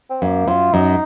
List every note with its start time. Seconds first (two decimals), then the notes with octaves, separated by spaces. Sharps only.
0.10 C4
0.22 F#2 A#3
0.48 F#2 F4
0.74 F#2 D#4